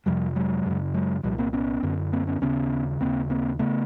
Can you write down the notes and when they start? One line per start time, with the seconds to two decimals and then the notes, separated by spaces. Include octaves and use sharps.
0.06 F2 C3 F3 G3
0.36 F#3 G#3
0.66 F#2 C#3
0.94 F#3 G#3
1.23 C2 A#2 F3 G3
1.38 A#3 C4
1.53 B3 C#4
1.83 F#2 D3
2.13 A#3 C4
2.27 B3 C#4
2.41 D#2 C#3 B3 C#4
3.01 D#2 C#3 A#3 C4
3.30 A#3 C4
3.59 C#3 A3 B3